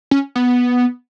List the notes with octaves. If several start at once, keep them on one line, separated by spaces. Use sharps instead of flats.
C#4
B3